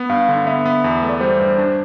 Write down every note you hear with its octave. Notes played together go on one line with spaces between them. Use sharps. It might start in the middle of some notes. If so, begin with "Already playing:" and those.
Already playing: B3
G2 F5
D3
B3 E5
B3
E2
A3
D5
G3 C5
G2
D4